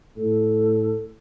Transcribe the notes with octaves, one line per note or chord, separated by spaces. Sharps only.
A2 A4